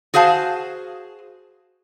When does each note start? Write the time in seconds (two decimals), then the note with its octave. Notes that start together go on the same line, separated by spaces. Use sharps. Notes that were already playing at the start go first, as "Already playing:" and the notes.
0.14 F#4 G#4 C5 F5 A5